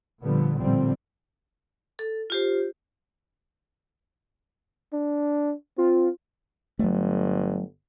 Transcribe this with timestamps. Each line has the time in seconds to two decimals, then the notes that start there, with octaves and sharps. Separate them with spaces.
0.23 A#2 D3 F3 G3 B3
0.58 A1 A#2 D3 F3 G3 C4
1.99 A4
2.30 F4 G4 C5
4.93 D4
5.78 C4 F4
6.79 G1 F#3 A3